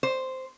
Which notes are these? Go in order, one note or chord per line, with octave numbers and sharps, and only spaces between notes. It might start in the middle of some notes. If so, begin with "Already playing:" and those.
C5